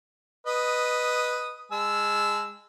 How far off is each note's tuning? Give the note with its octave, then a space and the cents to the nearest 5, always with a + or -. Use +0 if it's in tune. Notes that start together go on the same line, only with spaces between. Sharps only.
B4 +0 D#5 -10 D#6 +0
G#3 -20 A5 -45 E6 +0